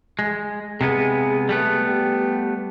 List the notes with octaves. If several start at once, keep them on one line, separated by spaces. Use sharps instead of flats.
G#3
C3 G#3 B3 G#4
G3 A3 B3
G4